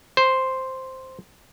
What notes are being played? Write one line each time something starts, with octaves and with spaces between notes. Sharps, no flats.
C5